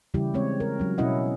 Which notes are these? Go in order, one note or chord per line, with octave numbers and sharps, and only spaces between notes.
C#3 E3 G3 E4 G4
G#3 C4 C#5
A#4
F#3 C#4
B2 C#4 E4 D#5 F#5